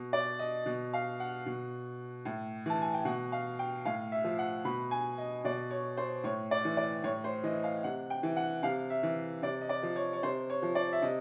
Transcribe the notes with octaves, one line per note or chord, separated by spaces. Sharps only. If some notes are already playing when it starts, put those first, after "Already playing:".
Already playing: B2
D5
D#5
B2
F5
F#5
B2
A2
E3 A5
G#5
G5
B2 F#5
F5
G5
A2 F5
E5
F3
F#5
B2 B5
G#5
D#5
B2 D5
C#5
C5
A2 C#5
D5
E3
D5
A2 C#5
C5
E3 D#5
F5
C3 F#5
G5
E3
F#5
C3 F5
E5
E3
C3 D5
D#5
D5
F3
C#5
C#5
C3 C5
C#5
F3
D5
E5
C3 D#5